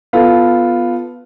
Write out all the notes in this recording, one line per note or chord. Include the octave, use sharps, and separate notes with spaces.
B3 F4 A4